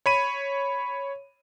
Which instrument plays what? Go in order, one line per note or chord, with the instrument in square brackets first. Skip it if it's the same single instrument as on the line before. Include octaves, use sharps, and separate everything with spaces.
[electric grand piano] C#5 B5 D#7